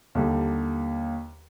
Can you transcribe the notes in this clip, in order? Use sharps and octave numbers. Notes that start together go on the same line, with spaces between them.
D#2 D3 G3